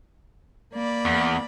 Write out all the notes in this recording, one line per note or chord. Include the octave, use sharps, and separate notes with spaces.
A#3 D5 B5
E2